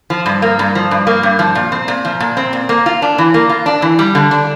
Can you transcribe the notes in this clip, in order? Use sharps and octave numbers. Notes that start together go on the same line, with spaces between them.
F3
G2
A#3
G2
F3
G2
A#3
G2
F3
A#2
C4
A#2
F3
A#2
C4
A#2
A#3
F4
D4
E3
A#3
F4
D4
E3
G3
D3
D4